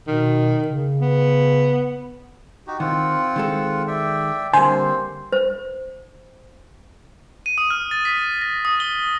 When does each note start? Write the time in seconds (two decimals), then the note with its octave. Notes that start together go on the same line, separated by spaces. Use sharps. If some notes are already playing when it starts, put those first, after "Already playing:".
0.08 B2 D#3
0.68 C#3
1.01 B3
2.67 D#4 F#4 G4
2.80 D#3 C4 F4 F#5
3.36 D#3 G#3 A4
3.87 D5 E5 G5
4.53 D3 G3 A#3 C4 C5 G#5
5.33 C5
7.46 D#7
7.58 D#6
7.70 F6
7.91 A6
8.05 B6
8.41 A#6
8.65 D#6
8.80 G7